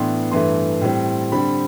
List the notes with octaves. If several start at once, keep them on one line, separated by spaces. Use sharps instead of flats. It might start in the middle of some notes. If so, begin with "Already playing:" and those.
Already playing: A2 E3 B3 D4 C6
G2 E3 A3 C6
A2 G3 C4
D3 G3 C4 B5